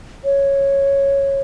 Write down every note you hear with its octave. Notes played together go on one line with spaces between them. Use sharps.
C#5